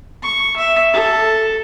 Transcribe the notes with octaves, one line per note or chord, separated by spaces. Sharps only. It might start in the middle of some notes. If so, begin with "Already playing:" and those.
C#6
E5
A4